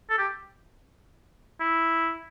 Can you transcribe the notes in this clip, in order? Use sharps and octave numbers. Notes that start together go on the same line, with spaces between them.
A4
G4
E4